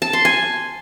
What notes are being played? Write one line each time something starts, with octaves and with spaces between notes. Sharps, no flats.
A5
C6
G#5